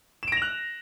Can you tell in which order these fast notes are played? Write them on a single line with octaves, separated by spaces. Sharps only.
E7 D7 A#6 F7 F#6